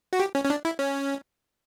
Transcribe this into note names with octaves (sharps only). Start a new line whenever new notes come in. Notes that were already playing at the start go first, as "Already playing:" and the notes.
F#4
G4
C#4
C#4
D4
E4
C#4